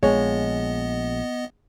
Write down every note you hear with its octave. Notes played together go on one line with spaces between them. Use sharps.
A#1 G#3 B3 C#5 D#5